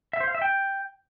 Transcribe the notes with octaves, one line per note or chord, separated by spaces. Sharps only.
E5
C5
F5
E5
G5